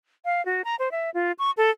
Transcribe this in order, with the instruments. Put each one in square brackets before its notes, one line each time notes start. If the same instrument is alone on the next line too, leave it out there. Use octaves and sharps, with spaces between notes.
[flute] F5
F#4
A#5
C5
E5
F4
C#6
A4